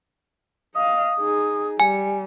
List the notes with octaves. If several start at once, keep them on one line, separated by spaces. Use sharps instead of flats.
D#5 F5 D#6
D#4 G#4
G3 G#5